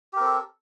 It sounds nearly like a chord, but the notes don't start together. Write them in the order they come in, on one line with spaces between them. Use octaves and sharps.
G4 A#4 C4 A4